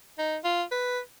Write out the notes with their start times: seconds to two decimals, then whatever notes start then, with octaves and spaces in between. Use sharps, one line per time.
0.18 D#4
0.45 F4
0.71 B4